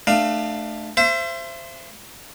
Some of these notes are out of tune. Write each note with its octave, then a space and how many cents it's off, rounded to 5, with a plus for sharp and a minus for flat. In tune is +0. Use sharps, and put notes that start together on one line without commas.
A3 +0 D4 +40 F5 +0
C5 +0 E5 +35